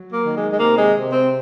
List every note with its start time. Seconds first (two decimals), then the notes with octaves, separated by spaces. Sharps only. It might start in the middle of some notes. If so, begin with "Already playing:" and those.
Already playing: F#3
0.12 A#3
0.24 D#3
0.36 G#3
0.52 G#3
0.59 C3 A#3
0.76 G#3
0.94 C3
1.12 C4